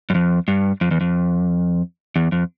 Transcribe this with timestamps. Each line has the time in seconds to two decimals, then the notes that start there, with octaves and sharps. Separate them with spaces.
0.10 F#2
0.15 F2
0.48 G2
0.81 F2
0.91 E2
1.01 F2
2.16 E2
2.32 F2